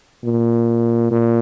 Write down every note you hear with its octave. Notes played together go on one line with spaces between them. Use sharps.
A#2
A#2